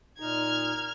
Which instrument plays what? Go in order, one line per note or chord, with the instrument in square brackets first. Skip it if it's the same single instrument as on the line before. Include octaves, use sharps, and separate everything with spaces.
[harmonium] A#2 D#4 [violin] F6 G#6